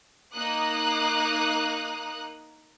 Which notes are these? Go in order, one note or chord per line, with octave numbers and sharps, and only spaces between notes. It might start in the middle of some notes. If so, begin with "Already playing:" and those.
A#3 D#4 D#6 F#6